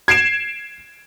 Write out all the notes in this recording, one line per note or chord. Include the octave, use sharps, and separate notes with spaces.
G#6 C7 D7 E7